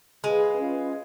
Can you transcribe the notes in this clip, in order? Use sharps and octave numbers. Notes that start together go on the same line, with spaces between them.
G#3 G#4 B4 F5 B5
C#4 F4 B4 F5